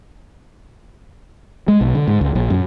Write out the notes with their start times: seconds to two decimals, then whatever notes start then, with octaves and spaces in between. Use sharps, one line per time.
1.68 G#3
1.81 B1
1.95 D3
2.08 G#2
2.21 C#2
2.35 A#1
2.50 F#2